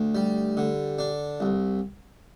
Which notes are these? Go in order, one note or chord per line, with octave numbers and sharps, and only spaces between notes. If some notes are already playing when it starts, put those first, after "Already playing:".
Already playing: D2
G3
D3
D4
C2